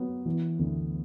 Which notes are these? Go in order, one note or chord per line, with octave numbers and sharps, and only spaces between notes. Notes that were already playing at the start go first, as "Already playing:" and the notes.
Already playing: F#3 B3
E3
D2